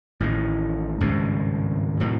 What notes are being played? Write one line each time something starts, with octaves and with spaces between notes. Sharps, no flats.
A1 A2 D#3
G#1 C#2 G2 C3
A2 C3 D#3 F#3